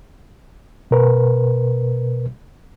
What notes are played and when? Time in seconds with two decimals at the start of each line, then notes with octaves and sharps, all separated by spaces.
0.91 B2 A#4 B4